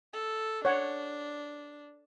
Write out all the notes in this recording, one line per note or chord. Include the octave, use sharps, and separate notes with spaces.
A4
D4 C#5 F#5